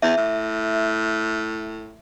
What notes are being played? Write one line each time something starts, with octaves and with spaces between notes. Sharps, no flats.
E2 E5
A2